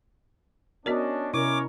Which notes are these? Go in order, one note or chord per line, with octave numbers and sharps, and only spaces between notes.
B3 C#4 D4 F#4 A#4 D5 D#5
C3 C#4 E4 A#4 C#5 D6